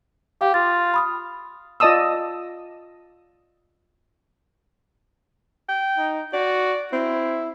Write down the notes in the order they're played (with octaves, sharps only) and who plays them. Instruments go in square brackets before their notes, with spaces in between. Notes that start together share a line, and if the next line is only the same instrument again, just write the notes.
[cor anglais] G4 [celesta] F5 D6
[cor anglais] F4 [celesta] A6
[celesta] B5 D#6 F6
[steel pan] F4 D5 D#5 A5 D#6 E6
[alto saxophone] G5
[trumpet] D#4
[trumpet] F#4 [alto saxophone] D5
[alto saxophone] C4 [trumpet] E4